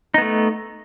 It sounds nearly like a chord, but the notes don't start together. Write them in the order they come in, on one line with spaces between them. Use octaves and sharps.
D#4 B3 A3